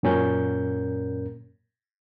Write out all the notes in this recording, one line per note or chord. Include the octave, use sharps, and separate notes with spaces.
F#2 A#2 C#4 A#4 G6